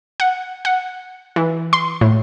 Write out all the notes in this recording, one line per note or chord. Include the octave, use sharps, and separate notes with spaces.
F#5
F#5
E3
C6
A2